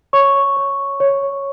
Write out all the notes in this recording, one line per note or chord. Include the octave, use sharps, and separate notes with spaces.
C#5 C#6
C#5
C#5